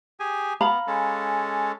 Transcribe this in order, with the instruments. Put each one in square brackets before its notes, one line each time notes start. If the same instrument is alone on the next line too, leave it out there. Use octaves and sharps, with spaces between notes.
[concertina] G4 G#4 G#5
[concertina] B3 [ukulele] F5 A#5 B5
[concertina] G#3 C#4 A4